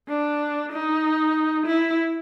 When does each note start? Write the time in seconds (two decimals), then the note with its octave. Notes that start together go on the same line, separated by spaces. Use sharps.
0.09 D4
0.72 D#4
1.67 E4